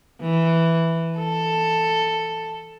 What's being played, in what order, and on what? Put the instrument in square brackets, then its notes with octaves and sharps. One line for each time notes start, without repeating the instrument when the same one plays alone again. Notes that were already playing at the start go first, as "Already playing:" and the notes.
[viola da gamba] E3
A4